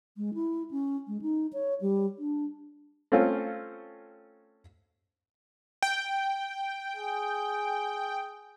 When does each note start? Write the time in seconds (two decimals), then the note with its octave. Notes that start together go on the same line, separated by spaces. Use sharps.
0.17 G#3
0.34 E4
0.71 C#4
1.08 G#3
1.22 D#4
1.53 C#5
1.81 G3
2.19 D4
3.12 A3 C4 C#4 F4
5.83 G5
6.96 G#4